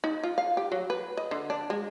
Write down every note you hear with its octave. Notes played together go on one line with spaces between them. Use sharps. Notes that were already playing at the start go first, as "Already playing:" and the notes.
D#4
F4
F5
G4
F#3
B4
D#5
D3
D4
G#3